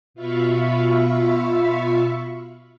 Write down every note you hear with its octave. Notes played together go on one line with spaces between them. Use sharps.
B2 F4 E5 F5 B5 C#6